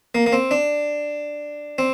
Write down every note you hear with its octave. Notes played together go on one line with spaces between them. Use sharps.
A#3
A#3
C4
D4
C4